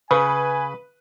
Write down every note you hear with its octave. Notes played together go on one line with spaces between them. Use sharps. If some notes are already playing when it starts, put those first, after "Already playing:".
C#3 B4 G#5